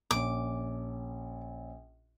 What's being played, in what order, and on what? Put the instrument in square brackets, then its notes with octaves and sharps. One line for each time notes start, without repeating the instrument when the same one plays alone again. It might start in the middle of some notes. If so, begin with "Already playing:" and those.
[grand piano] A#1 C#4 [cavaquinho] D6